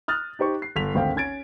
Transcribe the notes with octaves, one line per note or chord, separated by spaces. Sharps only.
D#6 F6 F#6 A6
D#4 G4 C5 C#6
C7
G1 B6 F7
G#1 D2 C4 F5 G5
C#4 G#6 A6 D7